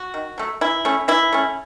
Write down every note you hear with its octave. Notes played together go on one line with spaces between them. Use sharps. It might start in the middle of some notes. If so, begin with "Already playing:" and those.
Already playing: F#4
D#3
F#3 A3
E3 E4
A3 C#4
E3 E4
A3 C#4